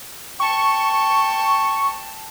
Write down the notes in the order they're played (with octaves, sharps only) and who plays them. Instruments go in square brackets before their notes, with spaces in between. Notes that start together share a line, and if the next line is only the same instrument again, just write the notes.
[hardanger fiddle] G5 A5 [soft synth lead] C#6